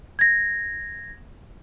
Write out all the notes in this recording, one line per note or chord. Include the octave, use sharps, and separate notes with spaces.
G#6 A#6